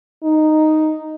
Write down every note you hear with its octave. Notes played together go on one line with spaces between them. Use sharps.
D#4